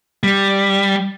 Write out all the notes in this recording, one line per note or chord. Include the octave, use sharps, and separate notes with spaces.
G3